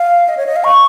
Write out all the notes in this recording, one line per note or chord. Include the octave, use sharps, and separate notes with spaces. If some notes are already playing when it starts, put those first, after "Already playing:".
Already playing: F5
D#5
C#5
D#5
F5
C#6